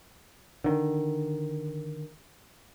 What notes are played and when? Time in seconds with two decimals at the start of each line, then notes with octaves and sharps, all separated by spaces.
0.64 D3 D#3